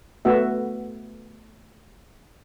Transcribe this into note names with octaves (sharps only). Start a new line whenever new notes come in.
A3 B3 F#4 E5